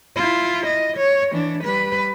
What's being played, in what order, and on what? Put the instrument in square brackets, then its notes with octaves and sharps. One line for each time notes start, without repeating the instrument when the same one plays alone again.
[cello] E4 F4
D#5
C#5
E3 D4
G3 B4